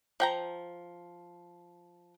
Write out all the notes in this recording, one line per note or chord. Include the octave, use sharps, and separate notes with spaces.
F3 G5 A#5